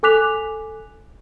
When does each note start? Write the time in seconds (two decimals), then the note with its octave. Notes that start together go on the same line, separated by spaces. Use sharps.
0.03 A4 G#5 D6 F#6 B6 F7